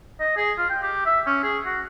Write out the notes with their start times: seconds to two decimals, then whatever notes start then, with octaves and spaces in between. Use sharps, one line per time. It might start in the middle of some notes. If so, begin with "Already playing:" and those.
0.20 D#5
0.37 G#4
0.58 F4
0.70 G5
0.82 G4
1.06 E5
1.27 C#4
1.43 G#4
1.65 F#4